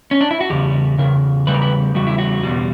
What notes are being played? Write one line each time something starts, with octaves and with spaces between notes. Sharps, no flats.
C#4
D4
E4
F#4
E2 C#3 G3 G4
E2 C#3 A#4
E2 C#3 G3 B4
A#4
B4
E2 C#3 G3 F#4
E4
F#4
E2 B2 G3